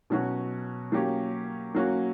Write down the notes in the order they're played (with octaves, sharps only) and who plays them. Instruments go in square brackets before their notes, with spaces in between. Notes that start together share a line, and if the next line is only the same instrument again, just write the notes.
[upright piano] B2 F#3 C#4 F#4
F#3 A#3 C#4 G4
F#3 A#3 C#4 F#4